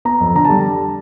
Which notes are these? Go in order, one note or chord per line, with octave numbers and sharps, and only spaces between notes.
B3 A#5
F2
D3 A#5
G3 A5